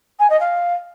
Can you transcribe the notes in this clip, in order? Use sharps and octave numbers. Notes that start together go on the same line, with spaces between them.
G#5
D#5
F5